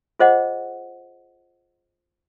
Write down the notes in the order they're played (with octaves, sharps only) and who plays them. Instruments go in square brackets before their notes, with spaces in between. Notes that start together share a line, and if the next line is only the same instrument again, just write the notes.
[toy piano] F4 G#4 C5 D#5 F#5